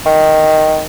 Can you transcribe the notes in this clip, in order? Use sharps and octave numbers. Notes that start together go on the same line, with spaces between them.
D#3